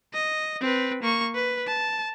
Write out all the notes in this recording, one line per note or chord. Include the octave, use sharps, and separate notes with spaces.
D#5
C4 B4
A#3 C#6
B4
A5